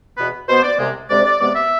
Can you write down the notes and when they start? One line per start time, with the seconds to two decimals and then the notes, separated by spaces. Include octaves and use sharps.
0.17 E2 B2 B3 B4
0.49 B2 B3 C5
0.63 D5
0.79 C2 C3 G#3
1.10 D2 C3 G#3 D5
1.26 D5
1.40 E2 C3 G#3 B3 D5
1.55 E5